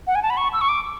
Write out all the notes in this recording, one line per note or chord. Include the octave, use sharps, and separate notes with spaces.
F#5
G#5
A5
B5
C#6
E6
C#6
D6